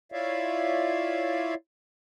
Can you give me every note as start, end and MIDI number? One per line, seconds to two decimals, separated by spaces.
0.12 1.54 64
0.12 1.54 65
0.12 1.54 73
0.12 1.54 74
0.12 1.54 76
0.12 1.54 77